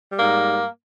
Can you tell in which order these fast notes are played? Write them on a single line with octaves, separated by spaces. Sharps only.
G3 A#3 G#2